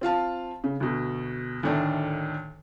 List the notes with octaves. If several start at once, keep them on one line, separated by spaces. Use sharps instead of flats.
C4 F4 F5 A5
C#3
D2 B2
D2 A2 D#3 D4